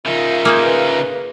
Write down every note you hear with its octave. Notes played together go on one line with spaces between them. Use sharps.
C#3 D#4 F4 A#4 E5
A#3 G#4 C5
B4